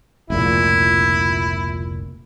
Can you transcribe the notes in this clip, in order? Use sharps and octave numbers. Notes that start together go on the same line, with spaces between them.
F1 C#2 A#2 E4